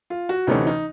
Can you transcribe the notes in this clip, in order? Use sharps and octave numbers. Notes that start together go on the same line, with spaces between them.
F4
F#4
D2 C3 E3 A3 C#4 D#4
D#4